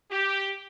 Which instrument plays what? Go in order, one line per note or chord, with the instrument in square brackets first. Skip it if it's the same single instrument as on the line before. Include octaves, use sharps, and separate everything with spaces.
[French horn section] G4